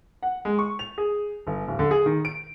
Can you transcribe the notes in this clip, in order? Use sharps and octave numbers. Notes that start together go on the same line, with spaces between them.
F#5
G#3
C#6
F7
G#4
G1
D1
D3
G#4
D#3
D7